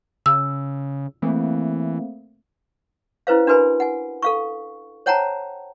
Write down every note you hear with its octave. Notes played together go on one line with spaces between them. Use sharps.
C#3 E6
E3 A3 A#3 C4
C#4 E4 B4 C5 F5
D4 F#4 A#4 B4 G#5 B5
F#5 G#5
A4 F5 C#6
C5 C#5 F#5 G5 A5 A#5